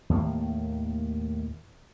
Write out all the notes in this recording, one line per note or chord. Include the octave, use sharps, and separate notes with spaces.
D#2 A2 D#3 A#3